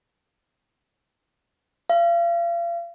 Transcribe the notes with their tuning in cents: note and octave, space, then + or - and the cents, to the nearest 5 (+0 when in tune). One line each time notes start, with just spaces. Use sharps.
F5 -35